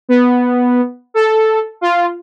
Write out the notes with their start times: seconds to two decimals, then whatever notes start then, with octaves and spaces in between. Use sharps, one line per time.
0.09 B3
1.14 A4
1.81 F4